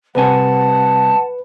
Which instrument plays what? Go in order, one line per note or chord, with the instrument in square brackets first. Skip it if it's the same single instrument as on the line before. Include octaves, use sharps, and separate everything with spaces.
[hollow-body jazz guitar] C2 C3 G#5 [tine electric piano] B4 [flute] F#5 [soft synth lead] A5